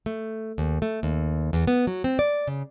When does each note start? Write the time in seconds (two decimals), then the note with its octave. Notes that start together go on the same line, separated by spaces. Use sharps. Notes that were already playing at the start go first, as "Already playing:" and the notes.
0.06 A3
0.58 D#2
0.82 A3
1.03 D#2
1.53 E2
1.67 B3
1.87 F#3
2.04 C4
2.19 D5
2.47 C#3